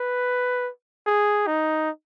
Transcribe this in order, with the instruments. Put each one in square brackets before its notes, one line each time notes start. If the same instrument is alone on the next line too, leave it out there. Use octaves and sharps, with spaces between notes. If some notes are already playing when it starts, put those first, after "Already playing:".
Already playing: [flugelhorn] B4
G#4
D#4